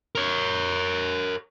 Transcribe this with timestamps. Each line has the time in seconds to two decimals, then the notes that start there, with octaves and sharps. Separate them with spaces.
0.15 A#4 C#5